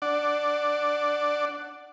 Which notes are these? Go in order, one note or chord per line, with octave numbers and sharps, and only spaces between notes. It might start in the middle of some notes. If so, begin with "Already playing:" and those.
D4 D5 F#5